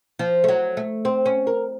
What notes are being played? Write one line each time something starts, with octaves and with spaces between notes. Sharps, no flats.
F3
A3
F#3
A3
C4
C#4
A#4